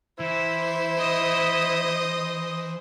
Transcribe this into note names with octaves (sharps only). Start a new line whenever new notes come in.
E3 E4 C5
D#5 D#6